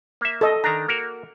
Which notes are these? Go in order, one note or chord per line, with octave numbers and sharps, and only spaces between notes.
A#3 E5
A4 D#5
D#3 D4 A#5
A#3 F#4 A#4